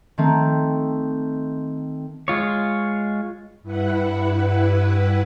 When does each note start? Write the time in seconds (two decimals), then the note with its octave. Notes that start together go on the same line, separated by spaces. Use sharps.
0.18 D#3 A3 C4
2.28 G#3 F4 C#5
3.63 G2 E4 B4 F#5